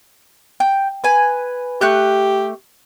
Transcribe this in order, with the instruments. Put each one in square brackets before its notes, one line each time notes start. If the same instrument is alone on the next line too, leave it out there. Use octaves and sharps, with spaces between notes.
[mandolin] G5
B4 G#5
[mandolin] A3 F#6 G6 [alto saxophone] G4